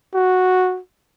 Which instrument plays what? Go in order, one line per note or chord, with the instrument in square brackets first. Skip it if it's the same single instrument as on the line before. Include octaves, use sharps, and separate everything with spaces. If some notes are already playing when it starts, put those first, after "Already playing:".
[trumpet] F#4